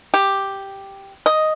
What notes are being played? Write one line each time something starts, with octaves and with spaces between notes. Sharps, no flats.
G4
D#5